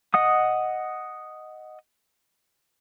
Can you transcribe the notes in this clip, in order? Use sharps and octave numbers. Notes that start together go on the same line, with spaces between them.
D#5 F#5 D#6